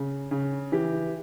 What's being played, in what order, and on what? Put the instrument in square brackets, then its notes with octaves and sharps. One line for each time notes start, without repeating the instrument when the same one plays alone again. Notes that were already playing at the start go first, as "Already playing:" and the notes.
Already playing: [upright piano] C#3
C#3
E3 G4